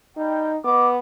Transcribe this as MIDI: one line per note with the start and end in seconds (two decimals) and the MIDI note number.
0.16 0.50 55
0.16 0.57 63
0.16 0.50 79
0.64 0.98 59
0.64 0.87 75
0.64 0.87 86